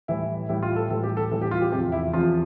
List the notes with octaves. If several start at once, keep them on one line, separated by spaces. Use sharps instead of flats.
A2 E3 G3 E4
A2 E3 G3 E4
F4
A4
A2 E3 G3 A4
G4
A4
A2 E3 G3 A4
G4
F4
G4
E2 C3 F3 G4
E4
E2 C3 F3 F4